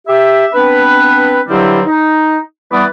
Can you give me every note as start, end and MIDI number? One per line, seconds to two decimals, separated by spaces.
0.08 0.47 67
0.08 0.47 76
0.54 1.42 59
0.54 1.42 60
0.54 1.42 62
0.54 1.42 71
1.49 1.81 43
1.49 1.81 50
1.49 1.81 54
1.49 1.81 55
1.49 1.81 60
1.49 1.81 64
1.86 2.38 63
2.72 2.85 52
2.72 2.85 55
2.72 2.85 59
2.72 2.85 71
2.72 2.85 74
2.72 2.85 87